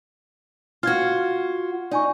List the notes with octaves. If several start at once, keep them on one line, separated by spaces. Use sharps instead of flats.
F4 F#4 F6 G#6
D#4 D5 G#5 C#6